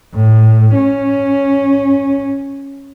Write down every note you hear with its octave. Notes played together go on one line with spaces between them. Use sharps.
A2
C#4